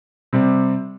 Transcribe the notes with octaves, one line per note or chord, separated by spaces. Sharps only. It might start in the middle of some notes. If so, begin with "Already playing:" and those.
C3 G3 C4